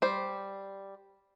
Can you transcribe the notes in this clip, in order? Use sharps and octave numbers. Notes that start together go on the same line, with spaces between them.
G3 C5